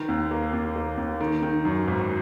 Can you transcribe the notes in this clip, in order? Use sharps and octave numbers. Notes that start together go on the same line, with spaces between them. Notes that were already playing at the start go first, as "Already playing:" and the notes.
Already playing: D#3
D#2
A#3
D#2
A#3
D#2
D#3
D#3
F#2
G#1